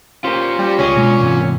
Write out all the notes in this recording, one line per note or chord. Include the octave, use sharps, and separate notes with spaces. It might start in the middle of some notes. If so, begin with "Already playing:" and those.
C#4 F4 G4 A#4 C5
G3
C#2 C#4 G#4 D#5
B2 G#3
E2 G#2 C3